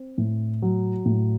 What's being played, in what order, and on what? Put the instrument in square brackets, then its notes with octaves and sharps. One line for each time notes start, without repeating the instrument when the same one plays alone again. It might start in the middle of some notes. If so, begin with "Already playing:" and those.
Already playing: [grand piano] C4
A2
F#3
A2